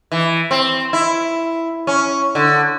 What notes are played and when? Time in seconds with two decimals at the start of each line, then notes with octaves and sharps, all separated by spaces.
0.12 E3
0.51 C4
0.93 E4
1.87 C#4
2.35 D3